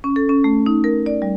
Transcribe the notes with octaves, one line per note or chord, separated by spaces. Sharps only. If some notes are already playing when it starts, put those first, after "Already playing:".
C#4
A4
C#4
A3
D#4
A#4
D5
G3